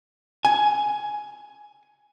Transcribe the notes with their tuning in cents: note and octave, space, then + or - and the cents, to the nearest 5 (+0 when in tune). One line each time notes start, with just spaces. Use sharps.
G#5 +10